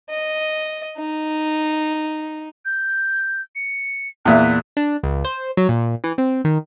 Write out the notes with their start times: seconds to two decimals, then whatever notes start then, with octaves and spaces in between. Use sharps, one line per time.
0.10 D#5
0.98 D#4
2.65 G6
3.56 C#7
4.25 E2 A#2 E5 F#6
4.77 D4
5.03 C#2
5.25 C5
5.57 F#3
5.69 A#2
6.04 E3
6.18 C4
6.45 D#3